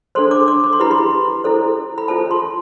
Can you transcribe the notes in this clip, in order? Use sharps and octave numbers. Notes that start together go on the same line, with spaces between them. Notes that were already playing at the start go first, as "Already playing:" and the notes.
D4 A4 C5 C6
D6
D6
D6
C6
E4 G4 B4 B5
C6
E4 A4 C5
B5
F4 A4 C5 A5
C6